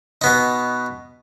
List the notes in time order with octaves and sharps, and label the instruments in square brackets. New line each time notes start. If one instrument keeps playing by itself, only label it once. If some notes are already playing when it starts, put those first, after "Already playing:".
[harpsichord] B2 B3 D#4